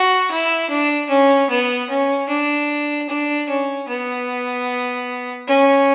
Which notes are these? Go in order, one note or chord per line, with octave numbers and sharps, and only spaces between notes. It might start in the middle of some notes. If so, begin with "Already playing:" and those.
Already playing: F#4
E4
D4
C#4
B3
C#4
D4
D4
C#4
B3
C#4